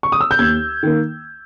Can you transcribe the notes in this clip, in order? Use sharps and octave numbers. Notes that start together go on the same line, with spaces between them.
C#6
D#6
E6
G6
D#2 G#6
D#3 A#3